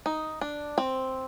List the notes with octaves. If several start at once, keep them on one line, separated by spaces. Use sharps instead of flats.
D#4
D4
C4